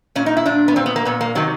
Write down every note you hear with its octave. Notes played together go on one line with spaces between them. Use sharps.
A#2 C#4
D#4
E4
A#2 D4
B3
A#2 C4
B3
A#3
A#2 B3
A#3
C3 D#3 F#3